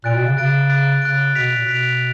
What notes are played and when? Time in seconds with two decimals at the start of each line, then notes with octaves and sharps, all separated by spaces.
0.04 A#2 F#6 A6 D7
0.15 B2
0.26 C#3
0.37 C#3 F#6 A6 D7
0.70 F#6 A6 D7
1.02 C#3 F#6 A6 D7
1.34 B2 F#6 B6 D7 F7
1.52 A#2
1.67 B2 F#6 B6 D7 F7